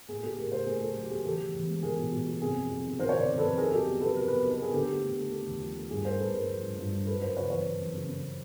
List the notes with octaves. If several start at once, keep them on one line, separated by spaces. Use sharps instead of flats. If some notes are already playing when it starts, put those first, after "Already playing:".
A2 G#4
A2 G4 A4
A2 G#4 A#4
A2 A#4 C5
A3 G#4 A#4
A2 G4 A4
F#3 G4
A3 G#4
E2 G4 A4
E2
E2
G#3
E2 G#4 A#4
B2
B2
B2
C3 G#4
F2
F2
D#3
D#3 A#4 C5
C#5
C3 C5 D5
D#3
A4 B4
F2
D#4 G#4 A#4
F#3 G4 A4
B3
B3 A4 B4
F#3 A#4
B3 B4
A#4
D#4
B4
B3 G#4 A#4
D3 G4 A4
A3
D3
A3
A3
D#2
F3
A3
G2 G#4
G2 A#4 C5
G2 A4 B4
G2 G#4 A#4
F3
G2
G2
G2
F#2 A4 B4
F#2 A#4 C5
C#3 B4 C#5
E3 B4 C#5
F#2
E3
C#3
C#3